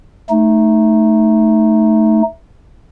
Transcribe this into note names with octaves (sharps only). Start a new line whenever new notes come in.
A3 D#4